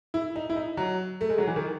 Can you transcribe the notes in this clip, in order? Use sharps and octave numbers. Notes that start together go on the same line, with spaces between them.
E4
D#4
E4
D#4
F#3
A3
G#3
F#3
E3
D#3